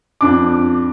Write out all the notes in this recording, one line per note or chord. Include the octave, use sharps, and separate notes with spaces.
F2 D4 D6